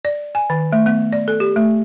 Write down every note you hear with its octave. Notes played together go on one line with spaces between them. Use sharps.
D5
G#5
D#3
A3
B3
D5
A4
G4
A3